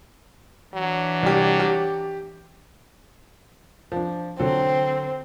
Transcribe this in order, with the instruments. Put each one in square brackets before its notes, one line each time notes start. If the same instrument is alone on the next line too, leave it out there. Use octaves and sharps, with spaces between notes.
[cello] E3 D4 [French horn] F#3
[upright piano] C2 G4
G4
F3 D4
[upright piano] D3 F#3 A4 [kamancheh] C4